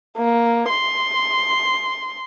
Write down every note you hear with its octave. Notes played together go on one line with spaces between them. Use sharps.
A#3
C6